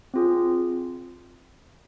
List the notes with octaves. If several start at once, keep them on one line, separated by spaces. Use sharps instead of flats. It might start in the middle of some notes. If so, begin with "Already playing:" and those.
C4 F4 G#4